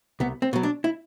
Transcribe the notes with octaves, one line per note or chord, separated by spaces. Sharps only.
C2 B3
C4
B2 F#3
D4
E4